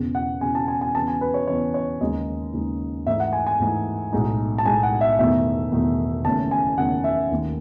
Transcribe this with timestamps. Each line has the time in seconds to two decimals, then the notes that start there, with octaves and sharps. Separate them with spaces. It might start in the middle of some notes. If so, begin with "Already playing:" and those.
Already playing: E1 E2 C#3
0.15 F#5
0.41 E1 E2 C#3 G#5
0.55 A5
0.68 G#5
0.81 G#5
0.94 E2 C#3 E3 B3 A5
1.08 G#5
1.21 B4
1.34 C#5
1.47 E2 C#3 E3 B3 C#5
1.74 C#5
2.01 D#2 C#3 G#3 D#4 D#5
2.53 D#2 C#3 G#3 D#4
3.06 G#2 E3 A3 D#4 E5
3.20 F#5
3.33 G#5
3.46 G#5
3.59 G#2 E3 A3 D#4
4.12 B1 A2 G#3 D#4
4.58 A5
4.65 B1 A2 G#3 D#4 G#5
4.83 F#5
5.01 E5
5.19 E1 E2 D#3 A3 D#4 E5
5.72 E1 E2 D#3 A3 D#4
6.25 F#1 E2 D#3 A3 C#4 A5
6.51 G#5
6.77 F#1 E2 D#3 A3 C#4 F#5
7.04 E5
7.31 D#2 D#3 A3